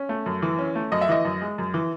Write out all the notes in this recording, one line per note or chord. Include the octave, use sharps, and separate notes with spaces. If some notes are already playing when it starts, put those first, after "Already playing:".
Already playing: C#4
A3
F#2
E3
C#4
A3
F#2 D#5
E5
E3 D#5
F#2
G#3
F#2
E3